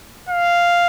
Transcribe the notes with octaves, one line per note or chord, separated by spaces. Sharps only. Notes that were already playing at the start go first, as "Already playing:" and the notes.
F5